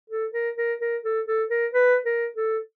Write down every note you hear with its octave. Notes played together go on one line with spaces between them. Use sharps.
A4
A#4
A#4
A#4
A4
A4
A#4
B4
A#4
A4